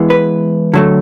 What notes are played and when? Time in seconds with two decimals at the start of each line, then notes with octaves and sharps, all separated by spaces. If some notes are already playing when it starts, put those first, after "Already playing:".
Already playing: E3 G#3 B3
0.10 B4
0.74 D3 F#3 A3